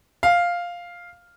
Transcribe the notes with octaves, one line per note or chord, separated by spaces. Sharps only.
F5